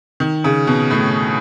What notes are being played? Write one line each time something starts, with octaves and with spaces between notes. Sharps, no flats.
D#3
C#3
B2
A2